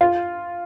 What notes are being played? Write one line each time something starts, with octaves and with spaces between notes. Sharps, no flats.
F4